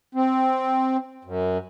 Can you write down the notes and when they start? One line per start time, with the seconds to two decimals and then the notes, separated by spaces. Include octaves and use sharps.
0.15 C4
1.25 F#2